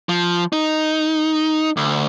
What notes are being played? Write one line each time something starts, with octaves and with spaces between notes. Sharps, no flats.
F3
D#4
D2